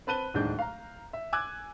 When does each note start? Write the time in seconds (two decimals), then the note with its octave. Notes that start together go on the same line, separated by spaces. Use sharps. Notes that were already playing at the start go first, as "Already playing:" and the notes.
0.07 C4 B4 A5 F#6 D#7 G7
0.34 D1 D#2 G#3 D4 G6
0.59 F5 A#5
1.13 E5
1.33 G#5 D6 E6 F#6 G#6